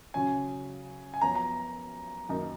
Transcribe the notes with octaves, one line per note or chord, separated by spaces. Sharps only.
C#3 F#3 C#4 G#5
G#5
F#2 F3 B3 F#4 C#5 A#5
A#5
F#2 D#3 A#3 D#4